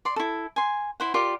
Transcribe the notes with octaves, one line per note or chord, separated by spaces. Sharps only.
D5 C6
E4 A4
G#5 C6
E4 C5 F#5
F4 G4 A#4 D5